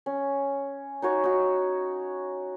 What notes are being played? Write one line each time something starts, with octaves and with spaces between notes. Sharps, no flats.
C#4
D#4 F#4 C#5
D#4 F#4